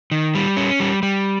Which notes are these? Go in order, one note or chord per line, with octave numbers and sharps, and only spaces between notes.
D#3
G3
C#4
G3
G3